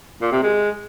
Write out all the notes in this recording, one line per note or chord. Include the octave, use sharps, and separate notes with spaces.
A#2
C3
G#3